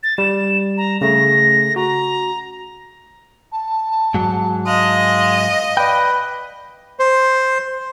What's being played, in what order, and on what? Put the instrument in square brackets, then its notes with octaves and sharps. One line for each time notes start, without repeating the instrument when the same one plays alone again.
[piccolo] A6
[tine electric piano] G3 [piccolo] E7
[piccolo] A#5
[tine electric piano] C#3 A3 [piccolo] A#6
[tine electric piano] F#4 [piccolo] A#5
[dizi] A5
[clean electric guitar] G#2 F#3
[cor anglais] G#3 [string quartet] D#5 [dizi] F5
[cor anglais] B4 [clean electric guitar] D5 G5
[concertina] C5